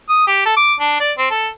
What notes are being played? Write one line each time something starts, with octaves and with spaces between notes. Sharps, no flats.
D#6
G4
A4
D6
D4
D5
C4
A4